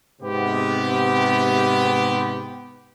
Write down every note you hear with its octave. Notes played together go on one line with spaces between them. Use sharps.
G#2 C3 B3 G4